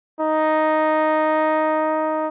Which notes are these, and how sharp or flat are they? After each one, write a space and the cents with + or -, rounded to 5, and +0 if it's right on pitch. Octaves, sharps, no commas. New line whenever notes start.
D#4 +0